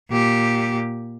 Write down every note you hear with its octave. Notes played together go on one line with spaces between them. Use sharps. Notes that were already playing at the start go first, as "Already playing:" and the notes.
A#2 G4